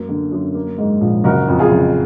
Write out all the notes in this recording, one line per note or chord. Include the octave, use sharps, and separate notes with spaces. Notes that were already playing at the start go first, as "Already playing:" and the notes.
Already playing: F#2 A#3
D3
F#2
A#3
G#2
A#1
F#1 F#4 A#4
F2
F4 G#4
F#1